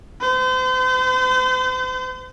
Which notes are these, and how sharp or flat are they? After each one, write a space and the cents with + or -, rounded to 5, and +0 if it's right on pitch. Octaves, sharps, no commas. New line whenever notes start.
C5 -40